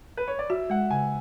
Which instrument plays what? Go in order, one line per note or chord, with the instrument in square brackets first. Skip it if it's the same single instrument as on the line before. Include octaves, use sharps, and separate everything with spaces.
[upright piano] B4
C#5
D5
[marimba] F#4 [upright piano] E5
[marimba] G#3 [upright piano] F#5
[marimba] C#3 [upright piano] G#5